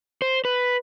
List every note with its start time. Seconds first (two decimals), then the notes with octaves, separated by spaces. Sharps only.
0.22 C5
0.45 B4